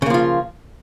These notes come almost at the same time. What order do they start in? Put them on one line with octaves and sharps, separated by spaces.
C#3 A#3 F3 F4